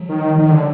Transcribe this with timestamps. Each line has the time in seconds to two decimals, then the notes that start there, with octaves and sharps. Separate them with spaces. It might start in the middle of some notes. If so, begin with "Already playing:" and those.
Already playing: F3 G3
0.09 D#3
0.38 D#3 F3 G3
0.51 D3